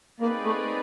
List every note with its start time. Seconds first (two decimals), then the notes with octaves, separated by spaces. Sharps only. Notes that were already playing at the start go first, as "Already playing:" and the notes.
0.20 A#3 C4 D#4 G#4 B4 D5
0.44 A3